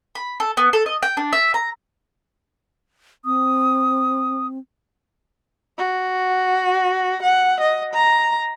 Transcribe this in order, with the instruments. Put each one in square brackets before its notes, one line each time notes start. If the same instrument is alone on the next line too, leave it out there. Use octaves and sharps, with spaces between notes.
[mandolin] B5
A4
B3
A4
D#5
G5
D4
E5
A#5
[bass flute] C4 [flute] D#6
[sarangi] F#4
F#5
D#5
A#5